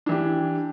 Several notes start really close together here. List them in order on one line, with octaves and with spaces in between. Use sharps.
D4 E3 G4